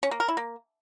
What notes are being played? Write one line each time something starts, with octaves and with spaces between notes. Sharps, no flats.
C#4
A#3
A#4
E4
A#3